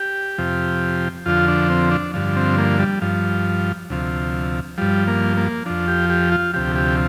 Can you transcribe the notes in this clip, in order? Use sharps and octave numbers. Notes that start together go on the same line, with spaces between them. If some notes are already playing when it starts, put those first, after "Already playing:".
Already playing: G4
F2 C3 F3
F2 D3 F3 F4
D4
C4
D4
G2 D3 F3
C4
A#3
G3
G2 F3
D2 C3 F3
G2 F3 G3
A#3
A#3
F2 F3 D4
G4
G4
F4
D2 C3 F3 G4
G4